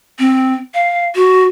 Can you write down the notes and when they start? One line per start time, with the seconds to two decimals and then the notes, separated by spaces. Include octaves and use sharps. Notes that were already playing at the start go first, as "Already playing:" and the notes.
0.19 C4
0.74 F5
1.15 F#4